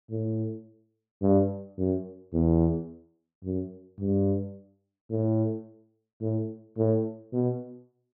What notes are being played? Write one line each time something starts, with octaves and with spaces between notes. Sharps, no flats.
A2
G2
F#2
E2
F#2
G2
A2
A2
A2
B2